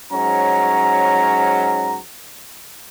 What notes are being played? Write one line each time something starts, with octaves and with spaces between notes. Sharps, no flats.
G#2 F#3 C#4 A#5